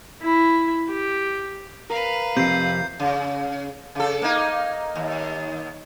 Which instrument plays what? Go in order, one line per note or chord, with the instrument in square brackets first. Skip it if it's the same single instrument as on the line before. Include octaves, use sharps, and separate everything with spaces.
[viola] E4
G4
[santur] A#4 [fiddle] B4 F5
[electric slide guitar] F2 C3 [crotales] G6 C7
[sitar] C#3
C#3 A4
A#3 D#4
D#2